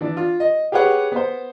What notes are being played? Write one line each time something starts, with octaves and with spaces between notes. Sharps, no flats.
E3 D4
F4
D#5
G4 G#4 B4 C#5 F#5
B3 C5